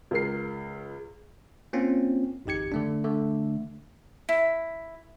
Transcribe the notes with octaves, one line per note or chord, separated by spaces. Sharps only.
C#2 A#4 C7
A#3 C4 C#4 F4
G#1 F2 D#4 G4 G#6 C#7
D3 A3 D4
D3 A3
E4